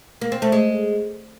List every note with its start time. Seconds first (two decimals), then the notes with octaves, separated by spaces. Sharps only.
0.21 A#3
0.32 C4
0.42 A3
0.52 G#3